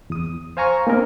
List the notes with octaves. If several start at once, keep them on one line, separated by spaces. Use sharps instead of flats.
E2 D#6
C5 F5 G#5 A#5 C#6
A#3 C4 D4 A#4 D#5